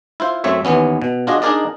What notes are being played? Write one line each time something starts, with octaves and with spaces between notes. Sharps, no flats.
E4 F4 C5
F#2 A3 C4 C#5 E5
D#2 E3 B3 C#4
B2
D4 F4 F#4 G#4 D#5
D4 D#4 G#4 A#4 D5 D#5